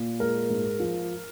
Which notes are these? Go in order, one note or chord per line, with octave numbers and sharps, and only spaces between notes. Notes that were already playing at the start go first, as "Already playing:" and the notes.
Already playing: A#2
G#3 A#4
G#2
F3